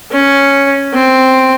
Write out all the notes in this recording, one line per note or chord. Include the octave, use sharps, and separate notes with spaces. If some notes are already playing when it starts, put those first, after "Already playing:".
C#4
C4